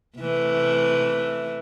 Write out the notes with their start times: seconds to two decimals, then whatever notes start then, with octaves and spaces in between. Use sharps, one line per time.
0.18 C3 E3 A3